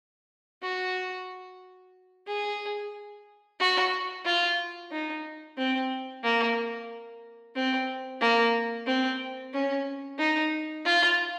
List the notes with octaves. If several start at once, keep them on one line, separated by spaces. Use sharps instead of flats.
F#4
G#4
F#4
F4
D#4
C4
A#3
C4
A#3
C4
C#4
D#4
F4